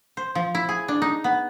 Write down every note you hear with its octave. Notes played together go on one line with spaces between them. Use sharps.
C5
F3
E4
G#4
D4
D#4
B3